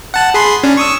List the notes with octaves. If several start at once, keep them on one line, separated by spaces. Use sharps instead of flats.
F#5 A5 F#6
G#4 B5 C6
C#4 D4
C#6 D#6 E6